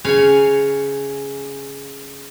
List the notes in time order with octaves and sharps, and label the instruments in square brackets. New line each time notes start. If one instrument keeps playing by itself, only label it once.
[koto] C#3 C#5 F5 G#5